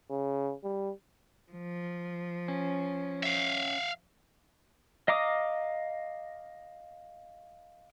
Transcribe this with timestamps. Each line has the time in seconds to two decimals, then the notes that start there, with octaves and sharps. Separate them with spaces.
0.10 C#3
0.64 G3
1.52 F3
2.48 C#4
3.23 E5 F5
5.08 D#5 F5 A#5 D6 D#6